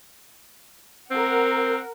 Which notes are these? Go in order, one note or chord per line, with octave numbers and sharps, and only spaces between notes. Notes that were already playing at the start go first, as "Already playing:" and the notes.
C4 A#4 F#5